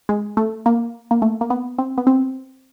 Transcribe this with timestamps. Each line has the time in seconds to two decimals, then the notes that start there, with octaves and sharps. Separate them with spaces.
0.09 G#3
0.37 A3
0.66 A#3
1.11 A#3
1.22 A3
1.41 A#3
1.50 B3
1.78 C4
1.98 B3
2.07 C4